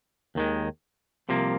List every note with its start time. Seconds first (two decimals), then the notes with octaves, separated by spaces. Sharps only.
0.35 D#2 D#3 G#3
1.29 C2 C3 F3 A#3